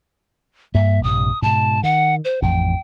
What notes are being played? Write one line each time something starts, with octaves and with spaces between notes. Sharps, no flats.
G2 A#3 E5
A#1 G2 C3 D#6
G#2 B2 A5
D#3 F#5
C5
A1 F2 A2 G5